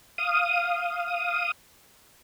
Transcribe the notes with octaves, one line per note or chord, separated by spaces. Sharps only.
F5 D#6